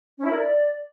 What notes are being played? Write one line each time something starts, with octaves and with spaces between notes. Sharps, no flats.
C#4
E4
A#4
D5